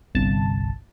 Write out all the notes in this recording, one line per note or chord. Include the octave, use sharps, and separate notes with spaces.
G1 C2 A5